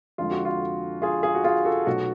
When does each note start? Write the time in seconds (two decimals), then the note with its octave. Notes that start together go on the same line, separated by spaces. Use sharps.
0.18 F2 D3 G#3 F4
0.31 F#4
0.45 F4
1.02 F4 G#4
1.23 F4 G#4
1.35 F#4
1.44 F4 G#4
1.65 F#4 A4
1.86 B1 B2 F#3 A3 F#4